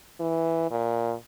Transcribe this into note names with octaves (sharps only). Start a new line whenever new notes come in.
E3
A#2